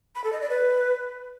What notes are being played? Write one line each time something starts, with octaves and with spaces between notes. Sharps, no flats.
B5
A4
D#5
D5
B4